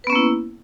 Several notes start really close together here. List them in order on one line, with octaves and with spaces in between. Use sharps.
B4 B3 C#4 A#3 E4